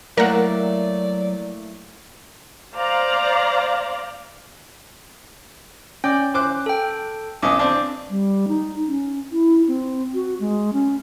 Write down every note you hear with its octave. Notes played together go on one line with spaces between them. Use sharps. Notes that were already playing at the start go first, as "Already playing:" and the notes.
F#3 A3 A#3 E4 A#4 D5 F#5
C5 D5 F5 A#5
C#4 D5 G5
C5 D6 F#6
A4 G5
B1 C#4 D#5 D6
C4 D4
G3
D#4
C#4
E4
C4
F#4
G#3
C#4